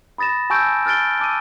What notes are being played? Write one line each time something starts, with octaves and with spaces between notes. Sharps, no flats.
B5 D#6 A6 A#6 E7
G#5 A5 C#6 E6 G6 D7
F6 F#6 A6 D7 G7
A5 D6 E6 D#7